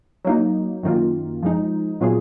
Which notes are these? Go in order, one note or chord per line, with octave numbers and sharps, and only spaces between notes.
F#3 A#3 D#4
F#2 D#3 A#3 F4
F3 G#3 D#4
A#2 F#3 B3 F4 G#4